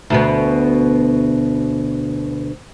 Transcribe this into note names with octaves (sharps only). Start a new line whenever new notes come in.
D2 B2 B3